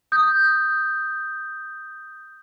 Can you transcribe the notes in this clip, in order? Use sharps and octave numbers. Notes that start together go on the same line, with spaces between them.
D#6 G6